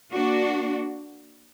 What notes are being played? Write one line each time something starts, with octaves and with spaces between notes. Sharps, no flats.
A#3 D4 F#4